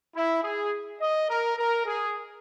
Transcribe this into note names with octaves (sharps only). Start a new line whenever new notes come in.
E4
G#4
D#5
A#4
A#4
G#4